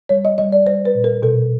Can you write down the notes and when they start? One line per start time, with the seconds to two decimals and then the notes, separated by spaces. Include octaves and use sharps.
0.09 G3 C#5
0.25 D#5
0.38 G3 D#5
0.52 D5
0.66 G3 C5
0.85 B4
0.95 A#2
1.04 A#4
1.22 B2 A4